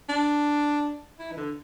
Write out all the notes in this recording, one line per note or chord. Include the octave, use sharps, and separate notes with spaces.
D4
E4
E3
D3